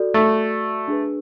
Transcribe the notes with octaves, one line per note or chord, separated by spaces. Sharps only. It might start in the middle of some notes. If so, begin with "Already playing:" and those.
Already playing: F#4 A4 D5
A3
D4 G#4 B4